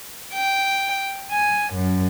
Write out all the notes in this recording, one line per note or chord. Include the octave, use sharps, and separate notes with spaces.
G5
G#5
F#2